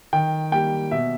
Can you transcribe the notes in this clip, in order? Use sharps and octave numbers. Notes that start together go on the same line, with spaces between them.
D#3 G5
G3 A#3 G5
B2 E5